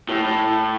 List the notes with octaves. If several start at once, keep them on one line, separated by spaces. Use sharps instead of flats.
A2
A2